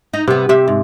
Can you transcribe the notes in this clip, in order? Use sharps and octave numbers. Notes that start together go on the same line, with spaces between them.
D#4
C3 G3 B3
C3 G4 E5
G#2